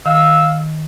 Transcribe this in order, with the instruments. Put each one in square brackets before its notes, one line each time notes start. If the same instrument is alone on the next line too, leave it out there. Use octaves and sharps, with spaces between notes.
[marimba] D#3 [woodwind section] F5 E6